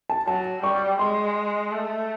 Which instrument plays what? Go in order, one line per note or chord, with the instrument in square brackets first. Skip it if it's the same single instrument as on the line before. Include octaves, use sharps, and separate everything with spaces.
[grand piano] A5
[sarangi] F#3 [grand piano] A5
[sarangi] G3 [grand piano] C#6
[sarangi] G#3 [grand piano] C6
[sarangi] A3